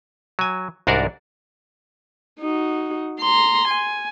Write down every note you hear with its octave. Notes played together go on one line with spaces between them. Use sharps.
F#3 G#5
C2 G#2 D4 F#4 A#4 D5
D#4 F#4
A#5 C6
G#5